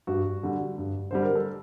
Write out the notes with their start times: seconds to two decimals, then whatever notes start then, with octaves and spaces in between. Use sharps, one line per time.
0.07 G2 F#4
0.43 D3 G3
0.78 G2
1.11 D3 G3 C5
1.22 A#4
1.35 A4